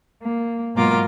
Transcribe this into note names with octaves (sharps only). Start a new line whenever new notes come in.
A#3
G#2 B2 F#3 A#3 F4 D6